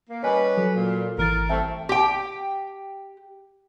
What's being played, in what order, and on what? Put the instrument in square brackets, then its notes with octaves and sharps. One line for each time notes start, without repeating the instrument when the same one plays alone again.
[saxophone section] A#3
[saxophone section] G3 C#4 B4 [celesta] C#5 D#5 G#5
[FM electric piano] F#3 [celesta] A4
[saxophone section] A#2
[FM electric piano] G#1 E3 A6 [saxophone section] A#4
[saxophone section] G3 A3 C4 [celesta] E5 G5 A5
[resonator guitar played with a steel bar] G4 G5